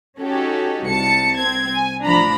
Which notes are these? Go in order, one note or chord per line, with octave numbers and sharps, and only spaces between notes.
C#4 D#4 F#4 G4 A4
C2 A5 C#7
C4 G#6
G#5
A1 F3 D4 A#5 B5